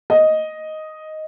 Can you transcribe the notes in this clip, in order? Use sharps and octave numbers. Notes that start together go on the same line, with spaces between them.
D#5